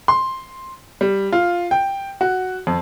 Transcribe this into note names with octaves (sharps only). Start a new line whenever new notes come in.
C6
G3
F4
G5
F#4
F2